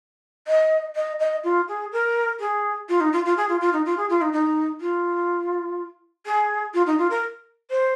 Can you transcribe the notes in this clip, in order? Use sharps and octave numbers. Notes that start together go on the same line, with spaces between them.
D#5
D#5
D#5
F4
G#4
A#4
G#4
F4
D#4
F4
F4
G#4
F4
F4
D#4
F4
G#4
F4
D#4
D#4
F4
G#4
F4
D#4
F4
A#4
C5